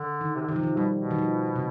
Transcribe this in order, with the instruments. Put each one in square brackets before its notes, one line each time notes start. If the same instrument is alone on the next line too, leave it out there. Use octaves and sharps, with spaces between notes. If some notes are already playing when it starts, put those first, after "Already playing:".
Already playing: [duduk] D3
[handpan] D#3
[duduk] C3
D3
[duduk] C3 [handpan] D#3
[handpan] F3
D#3
[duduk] B2 [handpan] G3
[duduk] B2
[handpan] D#3
F3
C3